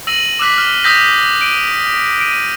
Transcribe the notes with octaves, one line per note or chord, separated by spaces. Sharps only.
E6 A#6 D#7 F#7
D6 E6 F#6 B6
F6 F#6
D#6 E6 G6 A#6 B6
D7 D#7
D7 D#7